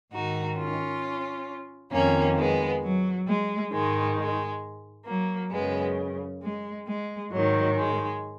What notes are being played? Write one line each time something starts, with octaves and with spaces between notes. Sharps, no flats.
G#2 D#3 D#4 F#4
C#4 F4
F2 D#3 A#3 C#4
G#3 B3
F#3
G#3
G#2 D#3 G#3
G#3
F#3 A#3
F#2 C#3 G#3 B3
G#3
G#3
G#2 D#3 F#3
G#3